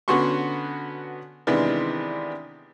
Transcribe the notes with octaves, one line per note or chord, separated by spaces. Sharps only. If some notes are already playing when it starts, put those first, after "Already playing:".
D3 B3 C#4 F#4 C6 C#6
C3 D#3 E3 G#3 B3 D4